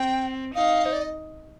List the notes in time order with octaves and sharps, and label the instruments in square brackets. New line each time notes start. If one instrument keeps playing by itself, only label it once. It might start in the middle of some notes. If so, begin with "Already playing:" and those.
Already playing: [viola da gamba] C4 [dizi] G5
[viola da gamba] D#4 [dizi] F5
[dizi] C5
D5
D#5